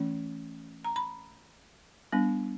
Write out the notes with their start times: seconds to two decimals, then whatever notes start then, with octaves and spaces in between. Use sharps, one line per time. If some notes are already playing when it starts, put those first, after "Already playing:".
Already playing: E3 A3 C#4
0.85 A#5
0.96 B5
2.12 G3 B3 D4